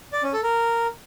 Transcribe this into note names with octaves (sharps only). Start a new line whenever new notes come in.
D5
C#4
A4
A#4